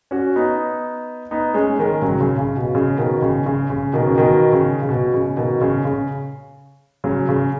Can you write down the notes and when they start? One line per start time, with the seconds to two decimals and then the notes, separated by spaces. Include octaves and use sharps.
0.11 C#4 F#4
0.36 B3 D#4
1.31 B3 D#4
1.54 G#3 C#4
1.79 D#3 G#3
2.02 C#3 F#3
2.21 C#3
2.38 C#3
2.57 B2
2.75 C#3
2.98 B2 D#3
3.22 C#3
3.46 C#3
3.70 C#3
3.93 B2 D#3
4.07 C#3
4.18 B2 D#3
4.53 C#3
4.82 C#3
4.89 B2
5.14 C#3
5.37 B2 D#3
5.61 C#3
5.85 C#3
7.04 C#3 F#3
7.29 C#3